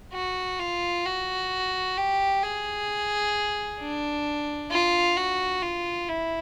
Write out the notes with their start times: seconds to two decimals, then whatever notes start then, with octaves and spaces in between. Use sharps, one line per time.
0.13 F#4
0.59 F4
1.05 F#4
1.97 G4
2.43 G#4
3.80 D4
4.70 F4
5.17 F#4
5.63 F4
6.09 E4